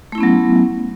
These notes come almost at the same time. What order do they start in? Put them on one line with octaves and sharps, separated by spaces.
A3 E4 C#4 B3 F#3